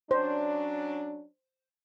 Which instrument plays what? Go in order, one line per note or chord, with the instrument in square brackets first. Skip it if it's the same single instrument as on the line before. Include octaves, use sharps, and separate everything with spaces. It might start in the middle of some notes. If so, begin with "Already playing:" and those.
[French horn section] F#3 C#4 D4 [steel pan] C5